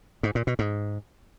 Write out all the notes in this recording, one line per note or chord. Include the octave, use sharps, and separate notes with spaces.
G#2
A#2
B2
G#2